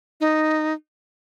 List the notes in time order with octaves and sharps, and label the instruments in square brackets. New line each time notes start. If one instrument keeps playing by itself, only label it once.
[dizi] D#4